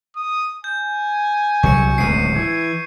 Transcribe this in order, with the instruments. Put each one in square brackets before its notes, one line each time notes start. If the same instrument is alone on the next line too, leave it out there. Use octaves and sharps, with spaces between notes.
[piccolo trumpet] D#6
[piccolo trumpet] G#5 [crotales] G6
[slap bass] C2 F#3 [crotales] C#6 C#7
[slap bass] D1 C#2 B2 [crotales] C7 D#7
[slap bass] E3 [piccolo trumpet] G#6